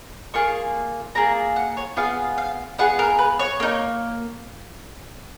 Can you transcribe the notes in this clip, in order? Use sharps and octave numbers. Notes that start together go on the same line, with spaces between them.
A#3 F4 G#4 C#6
A#3 F4 G#4 A#5
F#5
C#5
B3 F4 G#4 F5
F5
B3 F4 G#4 F#5
A#4
B4
C#5
A#3 D#4